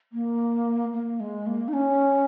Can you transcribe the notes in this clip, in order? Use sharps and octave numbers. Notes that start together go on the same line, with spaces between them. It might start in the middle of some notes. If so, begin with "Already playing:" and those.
A#3
A#3
G#3
A#3
D#4
C#4